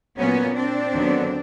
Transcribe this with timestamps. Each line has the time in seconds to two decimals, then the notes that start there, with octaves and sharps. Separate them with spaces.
0.18 A#2 F#3 A#3 B3 C#4
0.56 C4 D4
0.94 D#2 D3 F#3 B3